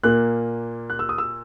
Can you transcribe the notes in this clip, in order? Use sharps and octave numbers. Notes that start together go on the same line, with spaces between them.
A#2 A#3 F#6
F#6
E6
D#6
E6